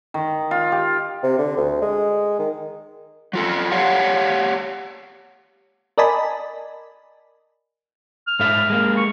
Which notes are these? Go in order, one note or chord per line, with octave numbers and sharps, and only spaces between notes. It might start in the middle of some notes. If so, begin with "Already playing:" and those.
D#3
F4
G4
C3
D3
D2
G#3
D#3
F#3 F4 A4
G4 C#5 D5 F5 F#5
A#4 D5 D#5 G#5 A5 B5
F6
G#2 A4 E5
G#3 A#3
C#6